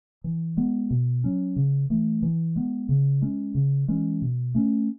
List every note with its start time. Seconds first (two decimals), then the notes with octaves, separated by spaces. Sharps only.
0.24 E3
0.57 G#3 B3
0.90 B2
1.24 F#3 C#4
1.56 C#3
1.90 E3 A3
2.22 E3
2.56 G#3 B3
2.89 C#3
3.22 G#3 C#4
3.55 C#3
3.88 E3 G#3 C#4
4.22 B2
4.55 A3 C#4